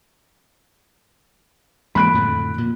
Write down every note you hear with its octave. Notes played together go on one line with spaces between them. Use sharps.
E2 G#3 A#3 B5 F#6 D7
F2 A2 D3
A#2